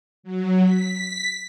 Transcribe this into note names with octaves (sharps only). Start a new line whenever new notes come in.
F#3
B6